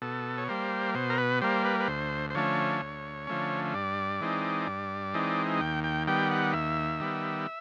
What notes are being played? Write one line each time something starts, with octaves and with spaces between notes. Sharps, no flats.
B2 A4
C#5
G3 A#3 C5
B2 C5
A#4
B4
G3 A#3 C5
B4
B4
D2 C5
C5
D3 F3 A3 C#4 C#5
D2
D3 F3 A3 C#4
G2 D5
E3 G#3 C4 D#4
G2
E3 G#3 C4 D#4
D#2 G5
G5
D#3 G3 B3 G5
F#5
D#2 E5
D#3 G3 B3